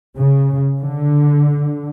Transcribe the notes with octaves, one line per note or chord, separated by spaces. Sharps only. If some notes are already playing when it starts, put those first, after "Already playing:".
C#3
D3